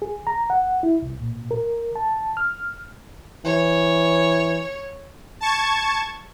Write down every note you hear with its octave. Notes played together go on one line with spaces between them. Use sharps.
G#4
A#5
F#5
E4
C2
A#2
A#4
A5
F6
E3 C#5
A5 C#6 G#6